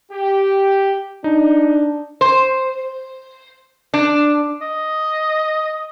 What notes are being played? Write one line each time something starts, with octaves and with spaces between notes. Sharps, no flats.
G4
D4 D#4
C5
D4
D#5